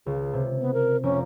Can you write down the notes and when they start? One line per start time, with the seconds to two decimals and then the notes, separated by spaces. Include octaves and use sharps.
0.06 C#2 G#4
0.34 C3
0.61 B3
0.74 A#4
1.03 F1 C#4 A#4